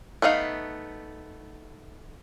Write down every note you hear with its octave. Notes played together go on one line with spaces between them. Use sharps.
A3 B3 D#4 F5